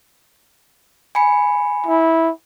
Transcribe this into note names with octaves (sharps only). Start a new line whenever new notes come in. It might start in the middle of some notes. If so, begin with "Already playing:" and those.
G#5 B5 C#7
E4